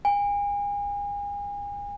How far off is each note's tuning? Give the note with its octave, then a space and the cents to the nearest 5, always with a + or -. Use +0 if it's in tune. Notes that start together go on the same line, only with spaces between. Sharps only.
G#5 -35